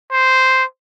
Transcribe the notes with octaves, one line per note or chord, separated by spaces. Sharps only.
C5